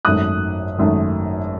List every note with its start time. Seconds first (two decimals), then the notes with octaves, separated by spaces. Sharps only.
0.05 G#1 F#2 D#3 A3 D#6 F#6
0.78 G#1 F#2 D#3 A3